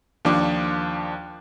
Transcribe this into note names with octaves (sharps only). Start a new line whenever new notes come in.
D#2 F3 D4 D6